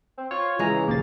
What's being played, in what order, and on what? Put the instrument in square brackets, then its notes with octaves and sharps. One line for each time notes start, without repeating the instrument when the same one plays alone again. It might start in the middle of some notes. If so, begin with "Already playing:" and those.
[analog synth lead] C4
[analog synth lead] F4 [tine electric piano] C#5
[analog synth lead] C#3 [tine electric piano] E3 A#5 [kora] G#3
[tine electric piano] A#1 D#2 A6 [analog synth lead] A#3